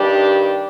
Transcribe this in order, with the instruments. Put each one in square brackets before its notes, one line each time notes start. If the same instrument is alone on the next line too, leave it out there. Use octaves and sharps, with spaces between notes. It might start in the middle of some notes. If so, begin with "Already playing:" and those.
Already playing: [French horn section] G2 D#3 G3 D4 G4